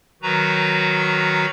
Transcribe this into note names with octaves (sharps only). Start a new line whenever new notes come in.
D#3 F#3 F#4 B4 A#5